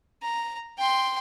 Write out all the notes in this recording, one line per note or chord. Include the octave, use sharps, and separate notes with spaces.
A#5
G5 C6